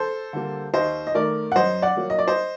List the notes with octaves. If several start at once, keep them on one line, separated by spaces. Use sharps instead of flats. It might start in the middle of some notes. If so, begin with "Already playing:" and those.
Already playing: A4 C5
D3 G3 A#3
D#2 C5 D#5
D#5
D#3 A3 A#4 D5
F#5
F#2 C5 D#5
D5 F#5
F#3 A#3
D#5
D5
C5 D#5